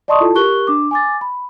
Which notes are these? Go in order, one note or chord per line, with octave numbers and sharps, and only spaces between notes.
D5 D#5 A5 C6 C#6 D#6
E4 F4 A4 A5
G4 A#4 C#6 F#6 G7
D4 D6
G#5 D6 A6
B5